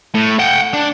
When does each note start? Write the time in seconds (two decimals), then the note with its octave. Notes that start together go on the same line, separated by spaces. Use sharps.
0.14 A2
0.39 F#5 G5
0.74 D4